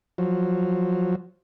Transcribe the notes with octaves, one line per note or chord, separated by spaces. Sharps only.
F3 F#3